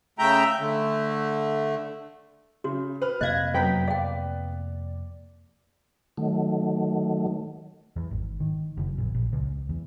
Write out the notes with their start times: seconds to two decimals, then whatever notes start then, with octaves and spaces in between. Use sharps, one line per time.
0.19 C#3 A3 E5 G5 A#5 G6
0.60 D3 A3
2.64 C#3 F#4
3.01 B4 F6
3.21 F2 C3 A#3 D#5 F5 F#6 G#6 A#6
3.54 F#2 B3 B4 G5 A#5 B6
3.88 D5 F5 G5
6.17 D#3 F#3 A3
7.96 E2
8.11 G#1
8.40 D#3
8.77 F#1
8.98 A#1
9.15 A#1
9.33 C#2
9.69 E2